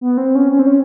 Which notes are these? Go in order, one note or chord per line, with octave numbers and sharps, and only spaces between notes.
B3
C4
C#4
C#4
C4
C#4